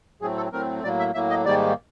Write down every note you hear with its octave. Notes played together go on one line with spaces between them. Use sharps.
A2 F#3 A3 C4 G#4
A4
A2 F#3 A3 C4 A#4
A2 F#3 A#3 D5
E5
A2 F#3 A#3 E5
D#5
G#2 D#3 G3 A#3 D5